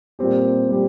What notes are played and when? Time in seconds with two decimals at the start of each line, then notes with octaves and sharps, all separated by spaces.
0.19 A#2 G3 C4 G4
0.70 A#2 G3 C4 G4